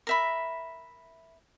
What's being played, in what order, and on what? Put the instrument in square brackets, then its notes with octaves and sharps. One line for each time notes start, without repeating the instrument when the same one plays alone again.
[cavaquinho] A#4 E5 B5